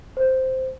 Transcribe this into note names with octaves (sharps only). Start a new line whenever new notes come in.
C5